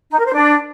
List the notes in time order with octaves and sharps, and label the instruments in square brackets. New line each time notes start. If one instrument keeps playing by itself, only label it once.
[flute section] D#4
A#4
C5
D4